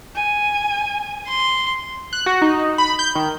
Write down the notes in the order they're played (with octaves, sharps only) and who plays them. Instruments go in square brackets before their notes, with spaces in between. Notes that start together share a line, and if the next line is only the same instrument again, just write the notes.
[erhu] G#5
[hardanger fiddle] C6
[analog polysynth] F#6
F#4
D#4
B5
G6
D#3